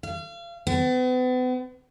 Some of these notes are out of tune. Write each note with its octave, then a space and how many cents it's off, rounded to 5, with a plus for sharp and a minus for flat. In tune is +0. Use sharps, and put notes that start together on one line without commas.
F5 -35
B3 +40